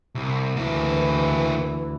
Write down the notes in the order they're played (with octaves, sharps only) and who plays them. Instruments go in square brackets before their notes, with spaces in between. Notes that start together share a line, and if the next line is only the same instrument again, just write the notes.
[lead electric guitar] C2
[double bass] D2 E3 [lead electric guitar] A#3 E4